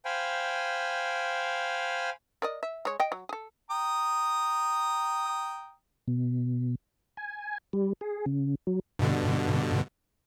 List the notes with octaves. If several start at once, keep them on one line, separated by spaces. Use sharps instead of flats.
C5 F5 G5 G#5 B5
A#4 D5 D#5
E5
G#3 C#5
D#5 G5
F#3
G#4 A4
G5 A#5 D#6
B2
G#5
G3
G#4
C#3
F#3
G2 B2 D3